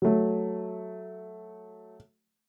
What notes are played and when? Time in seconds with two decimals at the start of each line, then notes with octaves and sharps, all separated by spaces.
0.02 F#3 A3